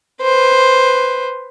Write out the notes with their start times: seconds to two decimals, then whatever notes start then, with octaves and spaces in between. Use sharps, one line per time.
0.22 B4 C5